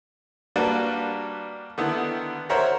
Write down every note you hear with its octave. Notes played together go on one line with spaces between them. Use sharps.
G3 A#3 D4 F#4 B4
D3 D#3 B3 E4
A#4 C5 C#5 E5 F#5 A#5